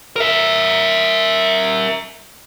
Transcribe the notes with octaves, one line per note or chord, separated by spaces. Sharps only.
A#4 E5